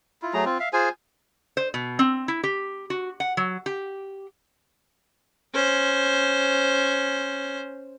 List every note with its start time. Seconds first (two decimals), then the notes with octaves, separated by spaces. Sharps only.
0.22 E4 F4
0.34 F#3 A3 G#4 A#5
0.45 C4 F4
0.60 E5 F5
0.73 F4 G#4 C5 G#5
1.57 C5
1.74 B2
1.99 C4
2.28 E4
2.44 G4
2.90 F#4
3.20 F#5
3.37 F#3
3.66 G4
5.54 C#4 C5